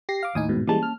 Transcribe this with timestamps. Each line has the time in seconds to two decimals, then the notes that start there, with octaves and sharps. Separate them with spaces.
0.09 G4 A#6 C7
0.23 F5 D6
0.35 D#2 A2 D#4 G#5 D#6
0.49 G#2 B2
0.67 E3 G3 G#3 A#3 C#4 A5
0.83 F6